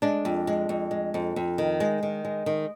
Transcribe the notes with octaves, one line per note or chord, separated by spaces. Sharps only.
G#3 D4
F2
G#3
F2
G#3
F2
F2
D#3
G#3
D#3
G#3
D#3